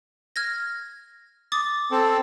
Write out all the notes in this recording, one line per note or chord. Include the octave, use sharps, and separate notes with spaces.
F6 G#6 A#6
D6 D#6 A6
C4 A4